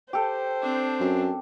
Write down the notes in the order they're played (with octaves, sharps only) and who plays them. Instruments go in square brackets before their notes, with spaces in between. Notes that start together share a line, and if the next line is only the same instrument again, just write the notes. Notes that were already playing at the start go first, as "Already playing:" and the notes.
[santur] G4 A4 [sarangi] C5
[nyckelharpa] C4 D4
[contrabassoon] F#2